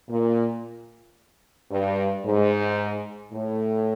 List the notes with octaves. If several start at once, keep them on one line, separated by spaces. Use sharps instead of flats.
A#2
G2
G#2
A2